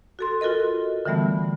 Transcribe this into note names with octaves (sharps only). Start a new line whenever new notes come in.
F#4 A4 C6
F4 F#4 A4 A#4 D#5
D3 E3 G3 A3 B3